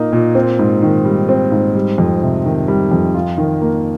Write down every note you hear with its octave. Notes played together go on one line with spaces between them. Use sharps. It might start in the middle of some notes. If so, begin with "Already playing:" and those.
Already playing: A#2 A#3 D#4
A#2
C4
G#2
D#3
G3
C4
G#2
G3
F2
C3
D#3
G3
F2
F4
D#3
A#3